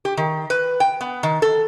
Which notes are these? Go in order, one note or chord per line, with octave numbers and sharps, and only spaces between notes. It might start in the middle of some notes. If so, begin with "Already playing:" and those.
G4
D#3
B4
G5
B3
D#3
A4